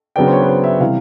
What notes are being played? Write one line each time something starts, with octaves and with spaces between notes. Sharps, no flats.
C#3 F#3 B3 D4 G5
C5
C#5
B4
C5
E5
C3 E3 G3 F5